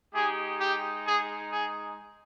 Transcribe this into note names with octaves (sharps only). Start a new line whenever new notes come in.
G#3 D#4 G4 G#4
G4
G#4
G#4